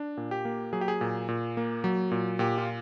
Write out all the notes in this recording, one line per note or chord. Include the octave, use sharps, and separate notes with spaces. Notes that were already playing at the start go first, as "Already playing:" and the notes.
Already playing: D4
A#2
G4
A#3
F#3 G#4
G4
G#4
A#2
A#2
A#3
F#3
A#2
A#2 G4
F4